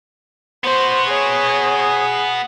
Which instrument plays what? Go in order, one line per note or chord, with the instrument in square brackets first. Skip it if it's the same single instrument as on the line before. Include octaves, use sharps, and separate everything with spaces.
[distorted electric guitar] B3 F#4 [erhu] C5
[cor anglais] G#4 [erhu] C#5